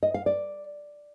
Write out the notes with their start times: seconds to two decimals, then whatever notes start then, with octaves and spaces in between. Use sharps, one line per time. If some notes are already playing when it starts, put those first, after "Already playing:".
0.03 D#5
0.14 F5
0.26 D5